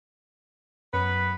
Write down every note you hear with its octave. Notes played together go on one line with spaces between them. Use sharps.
F#2 B3 B4